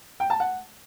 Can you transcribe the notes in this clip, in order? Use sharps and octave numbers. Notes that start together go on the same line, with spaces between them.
G5
A5
F#5